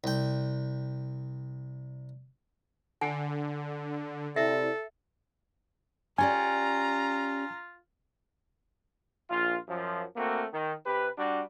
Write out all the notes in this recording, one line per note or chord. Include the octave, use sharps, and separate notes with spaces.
C2 G5
D3 F#5 G#5
C3 E4 A4 D5 E5
C#4 F4 G4 D5 G#5 A#5
A#1 F4
F#2 F3
A3 A#3 C4 F#4
D#3
C3 G4 B4
G3 D4 F#4